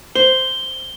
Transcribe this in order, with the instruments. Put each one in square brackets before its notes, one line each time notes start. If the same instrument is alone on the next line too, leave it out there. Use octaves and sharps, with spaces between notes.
[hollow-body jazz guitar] C5 [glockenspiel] G7